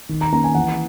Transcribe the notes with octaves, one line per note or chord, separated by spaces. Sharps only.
D#3
A#5
A#3 C#4 A#5
G#5
E3 F#5